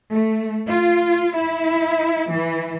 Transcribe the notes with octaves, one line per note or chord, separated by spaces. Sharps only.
A3
F4
E4
E3